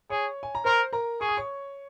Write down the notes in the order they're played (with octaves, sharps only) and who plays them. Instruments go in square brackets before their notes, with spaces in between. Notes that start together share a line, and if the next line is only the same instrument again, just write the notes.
[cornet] G#4 [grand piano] C#5 C#6
[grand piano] G#5
A#5
[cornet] A#4 [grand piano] C5 C6
[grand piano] A#4 A#5
[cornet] G#4 [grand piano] C#6
[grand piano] D#6
C#5 C#6